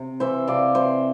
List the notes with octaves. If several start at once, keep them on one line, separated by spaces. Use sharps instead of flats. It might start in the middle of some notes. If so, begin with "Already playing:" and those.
Already playing: C3
E3 C5 E5
C3 D5 F5
E3 C5 E5